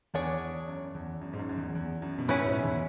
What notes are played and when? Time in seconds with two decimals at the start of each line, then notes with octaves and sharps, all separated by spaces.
0.14 E2 D4 G#4 C#5
0.68 F#2
0.95 E2
1.21 F#2
1.33 G#2
1.39 F#2
1.49 F#2
1.57 E2
1.75 E2
2.02 F#2
2.18 B2
2.28 F#2 A2 C#4 E4 B4
2.46 G#2 B2
2.63 E2